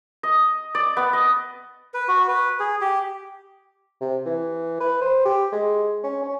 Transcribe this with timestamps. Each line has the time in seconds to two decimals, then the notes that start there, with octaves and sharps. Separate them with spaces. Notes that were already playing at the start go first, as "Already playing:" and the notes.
0.23 D#5
0.75 D5
0.97 B3
1.13 D#5
1.94 B4
2.08 F#4
2.28 B4
2.60 G#4
2.81 G4
4.01 C3
4.26 E3
4.81 B4
5.01 C5
5.25 G4
5.52 G#3
6.04 C#4
6.23 C#4